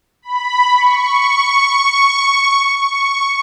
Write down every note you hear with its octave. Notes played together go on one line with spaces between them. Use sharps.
B5
C#6
C#6